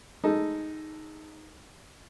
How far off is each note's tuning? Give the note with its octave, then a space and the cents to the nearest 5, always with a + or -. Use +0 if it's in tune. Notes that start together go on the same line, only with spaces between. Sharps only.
G#3 -5 D#4 +0 A4 +0